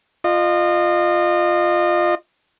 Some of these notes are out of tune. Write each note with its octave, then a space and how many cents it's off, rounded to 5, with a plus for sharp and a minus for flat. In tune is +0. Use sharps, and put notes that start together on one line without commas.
F4 +0 D#5 -30